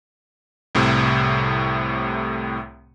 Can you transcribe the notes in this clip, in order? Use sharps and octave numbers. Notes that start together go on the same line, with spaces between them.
C2 A2 C3